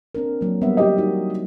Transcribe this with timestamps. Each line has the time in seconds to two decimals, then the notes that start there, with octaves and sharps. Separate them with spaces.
0.15 C4 D4 A#4
0.41 F#3 A#3
0.62 G3 B3 E5
0.77 G4 D#5
0.98 D#4 F#4